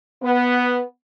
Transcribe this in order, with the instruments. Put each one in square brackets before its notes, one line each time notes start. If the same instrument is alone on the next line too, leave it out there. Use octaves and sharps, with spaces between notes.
[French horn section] B3